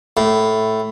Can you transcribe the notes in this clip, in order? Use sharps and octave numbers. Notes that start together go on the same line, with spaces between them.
A2